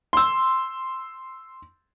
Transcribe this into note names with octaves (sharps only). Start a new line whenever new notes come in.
C6 E6